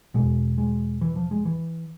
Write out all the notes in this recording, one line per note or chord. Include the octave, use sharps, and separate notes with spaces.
E2 B2 G#3
G#3
E3
F3
G#3
E3